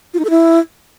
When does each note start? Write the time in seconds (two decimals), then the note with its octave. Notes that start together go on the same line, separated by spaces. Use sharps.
0.14 F4
0.19 D#4
0.25 A4
0.30 E4